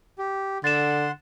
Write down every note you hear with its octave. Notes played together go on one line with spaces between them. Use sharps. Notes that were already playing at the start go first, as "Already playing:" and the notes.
G4
D3 F#5 C6 A6 E7